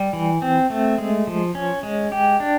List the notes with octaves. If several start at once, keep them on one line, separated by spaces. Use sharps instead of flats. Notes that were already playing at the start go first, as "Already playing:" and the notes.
Already playing: G3
E3
C4
A3
G#3
F3
C#4
G#3
G4
D4